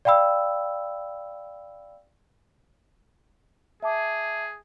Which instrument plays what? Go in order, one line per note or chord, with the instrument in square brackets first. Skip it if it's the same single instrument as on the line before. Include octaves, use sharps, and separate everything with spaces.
[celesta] D5 F5 G5 B5 E6
[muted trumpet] G#4 [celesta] E5 A5 D6